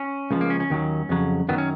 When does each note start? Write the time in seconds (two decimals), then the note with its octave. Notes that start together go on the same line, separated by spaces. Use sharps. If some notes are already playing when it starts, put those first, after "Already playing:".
Already playing: C#4
0.31 C#2 C#3 F3
0.41 A#3
0.50 C#4
0.60 C#4
0.70 D#2 D#3 F#3
1.09 F2 C#3 F#3
1.49 F#2 D#3 F#3 B3
1.58 C#4